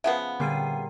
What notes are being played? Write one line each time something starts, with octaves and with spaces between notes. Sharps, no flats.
C#3 F3 B3 E5 F#5
A#2 D3 G3 A#3 C7 D#7